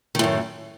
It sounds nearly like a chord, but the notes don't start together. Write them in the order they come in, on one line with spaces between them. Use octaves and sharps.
D#3 A2 F#2